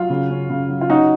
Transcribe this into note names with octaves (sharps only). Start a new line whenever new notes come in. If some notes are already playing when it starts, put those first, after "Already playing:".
Already playing: F#3 F4
C#3
C#4
C#3
F#3
F4
C#4 D#4 F#4